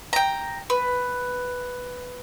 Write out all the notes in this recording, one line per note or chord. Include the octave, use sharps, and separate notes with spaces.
G5 A#5
B4